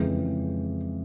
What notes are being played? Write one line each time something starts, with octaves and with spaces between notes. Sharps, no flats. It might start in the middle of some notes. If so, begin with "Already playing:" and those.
Already playing: F2 C#3 E3 G#3